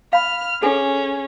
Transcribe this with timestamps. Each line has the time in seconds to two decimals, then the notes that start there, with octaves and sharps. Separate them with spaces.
0.13 F5 B5 F6
0.62 C#4 G#4 A4 G#5